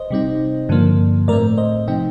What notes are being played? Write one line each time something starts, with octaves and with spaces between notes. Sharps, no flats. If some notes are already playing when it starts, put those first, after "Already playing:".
Already playing: C5 D#5
C3 G3 C4 D#4
G2 D3 F3 A#3
A2 A3 C4 A#4 D5
C5 D#5
C3 F3 A3 C4 D#4 D#5 G5